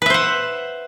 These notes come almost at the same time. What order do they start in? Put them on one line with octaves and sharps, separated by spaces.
B4 E5 C5 F#5